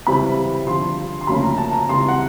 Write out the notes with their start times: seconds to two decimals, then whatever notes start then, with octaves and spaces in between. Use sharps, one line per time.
0.07 C#2 C3 E3 G3 C4 B5
0.67 G2 D3 F3 C6
1.21 C6
1.27 D2 C#3 F3 A#3 C#4 B5
1.43 A#5
1.58 A5
1.73 A#5
1.89 C#2 C3 E3 G3 C6
1.99 A#5
2.08 F#5